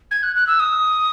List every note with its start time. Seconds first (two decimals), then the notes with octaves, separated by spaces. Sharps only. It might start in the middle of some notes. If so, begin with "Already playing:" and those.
0.11 G#6
0.23 F#6
0.36 F#6
0.47 E6
0.60 D#6